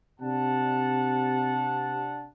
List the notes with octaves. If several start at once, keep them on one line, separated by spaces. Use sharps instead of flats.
C3 D4 F#5 A5